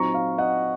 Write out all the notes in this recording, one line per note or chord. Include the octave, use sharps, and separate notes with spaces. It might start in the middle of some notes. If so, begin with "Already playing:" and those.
Already playing: A#2 F#3 C4 D#4 A#5 C#6
F5
D#5 F#5